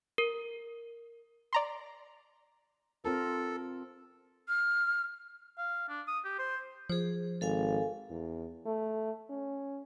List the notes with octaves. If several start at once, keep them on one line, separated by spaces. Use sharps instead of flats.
A#4
D5 A#5 C6
C4 F4 A4 A#4
F6
F5
D4
D#6
G4
C5
F3 G#4 C5
G#1 A4 F5 G#5
E2
A3
C#4